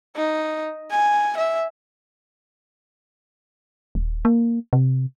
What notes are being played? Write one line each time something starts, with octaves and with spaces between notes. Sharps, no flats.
D#4
G#5
E5
D#1
A#3
C3